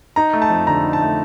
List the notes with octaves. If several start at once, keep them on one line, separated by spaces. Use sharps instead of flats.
D#4 A#5
A3
A5
F2
D3 A#5
D#4
A5
A3